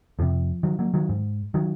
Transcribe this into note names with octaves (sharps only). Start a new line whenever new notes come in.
F2 C3 F3
D#3 F#3
F#3 A#3
D#3 F#3
G#2
D#3 F#3